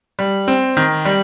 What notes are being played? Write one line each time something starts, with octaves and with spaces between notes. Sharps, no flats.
G3
C4
D#3
G3